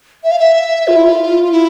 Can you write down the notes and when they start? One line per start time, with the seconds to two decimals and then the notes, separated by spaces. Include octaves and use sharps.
0.24 E5
0.31 F5
0.39 E5
0.88 F4
0.96 E4
1.04 F4
1.44 F4
1.52 E4